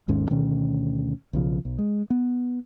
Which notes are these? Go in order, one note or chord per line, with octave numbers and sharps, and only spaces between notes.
G#1 D#2 G#2 C#4
D2 B2 D#3 C#4
B1 C#3 F3
B1
G#3
B3